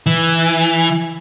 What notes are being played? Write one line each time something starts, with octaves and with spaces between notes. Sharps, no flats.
E3